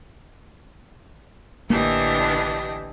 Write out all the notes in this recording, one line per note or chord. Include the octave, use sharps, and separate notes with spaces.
A1 D3 E3 A#3 D4 G4 D#5